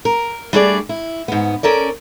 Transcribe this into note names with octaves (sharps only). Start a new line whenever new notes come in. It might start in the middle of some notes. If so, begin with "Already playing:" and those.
A#4
G3 A3 D4 G#4 C5 D5
E4
G#2 B3
C#4 A4 A#4 D5